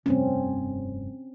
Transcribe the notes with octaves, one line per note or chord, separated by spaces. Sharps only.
F1 G2 C4 C#4